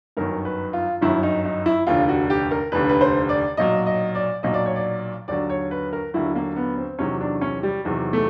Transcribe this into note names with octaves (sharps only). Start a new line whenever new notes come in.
G1 F#2 D#3 F#3 A#4
B4
F4
G1 F#2 D#3 F#3 E4
D#4
D#4
E4
F1 D#2 D3 F4
F#4
G4
A#4
F1 D#2 D3 B4
B4
C5
D5
B1 A#2 F#3 D#5
D#5
D5
B1 A#2 F#3 D#5
D5
C#5
D5
D#2 D3 F#3 D5
C#5
B4
A#4
D#2 D3 F#3 E4
A#3
B3
C4
E2 C3 D#3 F#3 C#4
D4
C#4
G3
E2 C3 D#3 F#3
A3